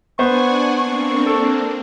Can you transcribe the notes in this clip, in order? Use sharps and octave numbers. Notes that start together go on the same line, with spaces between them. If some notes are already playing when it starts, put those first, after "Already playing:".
B3 D4 C5 F#5 G#5 C#6
A#3 C4 D4 C#6
A4